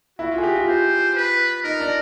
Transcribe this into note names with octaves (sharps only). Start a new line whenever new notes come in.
E4 F#4
F4
G#4
G4
F4
F4 C5
B4
D#4 A#4
D4